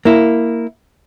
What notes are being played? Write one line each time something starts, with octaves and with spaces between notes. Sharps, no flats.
A#3 E4